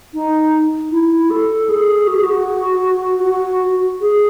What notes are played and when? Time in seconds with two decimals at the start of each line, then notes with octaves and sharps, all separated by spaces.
0.14 D#4
0.92 E4
1.30 A4
1.69 G#4
2.07 F#4
2.15 G#4
2.24 F#4
3.24 F#4
4.01 G#4